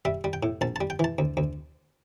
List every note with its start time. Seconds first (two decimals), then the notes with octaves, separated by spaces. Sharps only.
0.05 G3 E5
0.24 G3
0.33 G5
0.43 A2
0.61 A#1 A5
0.76 A5
0.81 G3
0.90 G5
0.99 E3 A5
1.18 D2
1.37 D2